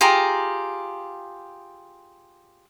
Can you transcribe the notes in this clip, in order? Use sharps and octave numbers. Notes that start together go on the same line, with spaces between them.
F4 G4 G#4 A#5